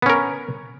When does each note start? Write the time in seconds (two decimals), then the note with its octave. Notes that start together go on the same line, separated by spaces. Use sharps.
0.02 B3
0.06 C#4
0.10 A#4